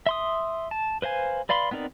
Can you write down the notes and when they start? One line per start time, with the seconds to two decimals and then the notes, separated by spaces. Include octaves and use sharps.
0.06 E5 C6 D#6
0.71 A5
1.02 B4 C5 F5 G#5
1.49 B4 D5 F5 B5 C6
1.71 B3 C4 D#4 A#4 D5